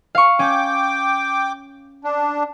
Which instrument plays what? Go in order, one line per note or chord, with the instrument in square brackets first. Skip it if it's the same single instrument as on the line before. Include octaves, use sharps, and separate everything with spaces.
[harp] F5 C#6
[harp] C#4 [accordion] G5 D6
[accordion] D4